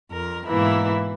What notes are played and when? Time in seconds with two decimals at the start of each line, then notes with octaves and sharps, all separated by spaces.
0.11 F2 A#4
0.47 G#2 B2 E3 A#3 E4